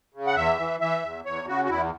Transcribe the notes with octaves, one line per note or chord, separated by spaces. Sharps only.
C#3
F#5
E2 E5
E3
E3 E5
E2
E2 C#5
C#3 F#4
F#4
E2 E4